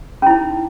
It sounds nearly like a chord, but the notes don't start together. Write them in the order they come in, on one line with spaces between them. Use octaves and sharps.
C#4 E4 D#4